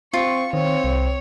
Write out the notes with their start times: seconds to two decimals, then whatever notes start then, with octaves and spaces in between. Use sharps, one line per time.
0.13 C4 F4 C#6
0.53 D#3 C4 C#5
0.84 C2